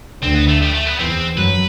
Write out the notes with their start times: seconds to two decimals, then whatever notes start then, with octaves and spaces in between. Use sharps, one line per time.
0.23 D2 D3 C4
0.35 B3
0.48 A3
0.61 G3
0.74 A3
0.86 B3
0.99 E2 E3 C4
1.37 F#2 F#3 B4